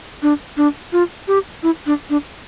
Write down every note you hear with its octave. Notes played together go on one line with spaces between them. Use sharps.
D4
D4
F4
G4
E4
D4
D4